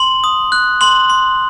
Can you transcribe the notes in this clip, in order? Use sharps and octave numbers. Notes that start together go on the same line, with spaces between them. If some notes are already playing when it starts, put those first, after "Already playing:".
Already playing: C6 F#7
D#6
F#6
C6 F#7
C6